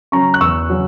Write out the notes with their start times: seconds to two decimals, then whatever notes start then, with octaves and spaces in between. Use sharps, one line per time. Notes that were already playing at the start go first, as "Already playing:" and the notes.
0.12 C#3 F#3 C#4 A#5 C#6
0.34 F#6
0.41 E2 C#6 E6
0.69 C#3 F#3 C#4